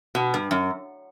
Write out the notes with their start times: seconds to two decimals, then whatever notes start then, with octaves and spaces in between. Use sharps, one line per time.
0.15 B2
0.34 G2
0.51 F#2